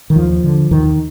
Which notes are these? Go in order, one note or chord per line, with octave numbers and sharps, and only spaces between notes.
D#3
D#2 F3
D3
D#2 D#3